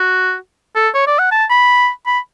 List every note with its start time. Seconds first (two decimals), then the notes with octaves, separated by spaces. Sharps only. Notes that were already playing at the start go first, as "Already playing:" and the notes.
Already playing: F#4
0.76 A4
0.95 C#5
1.07 D5
1.19 F#5
1.32 A5
1.50 B5
2.06 B5